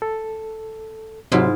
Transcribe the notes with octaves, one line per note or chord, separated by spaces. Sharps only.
A4
G#2 C3 F#3 E4 F4